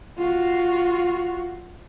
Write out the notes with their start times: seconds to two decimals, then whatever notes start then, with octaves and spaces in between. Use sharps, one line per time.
0.18 F4 F#4